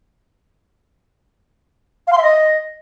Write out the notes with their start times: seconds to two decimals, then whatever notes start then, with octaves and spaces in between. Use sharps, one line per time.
2.07 F5
2.12 C6
2.18 E5
2.23 D#5